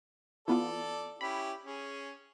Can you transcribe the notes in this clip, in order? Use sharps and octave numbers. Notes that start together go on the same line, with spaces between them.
E3 B3 F4 A4 D5
C#4 E4 G4 B5
C#4 G#4